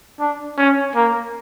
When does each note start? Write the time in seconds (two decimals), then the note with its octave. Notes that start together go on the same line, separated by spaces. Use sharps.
0.20 D4
0.58 C#4
0.95 A#3